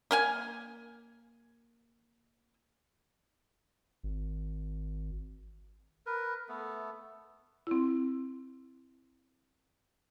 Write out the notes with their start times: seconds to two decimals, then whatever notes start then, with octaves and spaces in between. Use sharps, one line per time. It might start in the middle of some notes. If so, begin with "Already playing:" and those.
0.11 A#3 F5 G#5
4.04 G#1
6.06 A#4 B4
6.49 A3 B3
7.67 C4 E4